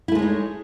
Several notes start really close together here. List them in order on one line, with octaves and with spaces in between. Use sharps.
E4 A3 G#3 C#5 D#4